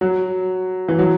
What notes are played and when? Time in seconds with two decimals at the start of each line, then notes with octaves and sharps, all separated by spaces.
0.01 F#3
0.88 E3
0.99 F#3